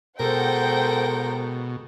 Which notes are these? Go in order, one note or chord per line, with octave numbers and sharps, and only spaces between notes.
B2 G#3 A4 A#4 C5 F#5 G5